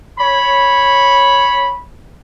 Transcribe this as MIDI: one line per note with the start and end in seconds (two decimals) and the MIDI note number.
0.19 1.81 73
0.19 1.81 83